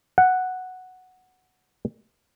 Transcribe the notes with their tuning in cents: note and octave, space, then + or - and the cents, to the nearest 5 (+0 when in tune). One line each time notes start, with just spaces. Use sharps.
F#5 +0